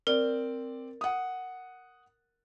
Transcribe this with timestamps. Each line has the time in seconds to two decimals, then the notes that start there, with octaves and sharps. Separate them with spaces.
0.07 C4 A#4 C5 D5
1.01 F#5 D#6